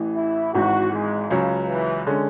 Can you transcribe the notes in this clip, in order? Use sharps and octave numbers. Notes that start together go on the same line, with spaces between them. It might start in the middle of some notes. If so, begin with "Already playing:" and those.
Already playing: A1 A2 E3
E4
G#1 G#2 E3 F#4
G#3
C#2 C#3 F#3 C#4
E3
D3 G#3 C#4